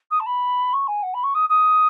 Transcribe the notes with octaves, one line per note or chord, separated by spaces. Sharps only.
D#6
A5
B5
C#6
G#5
F#5
B5
C#6
D#6
D#6